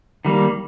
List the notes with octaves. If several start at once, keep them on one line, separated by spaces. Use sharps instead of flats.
D#3 G3 A#3